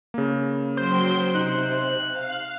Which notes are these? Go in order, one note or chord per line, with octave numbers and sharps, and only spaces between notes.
C#3 A#3
F#3 C5 G5 G6
C3 D#4 F#6
F5